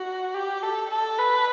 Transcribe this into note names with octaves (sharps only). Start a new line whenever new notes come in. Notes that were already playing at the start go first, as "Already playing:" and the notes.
Already playing: F#4
G4
A4
A4
B4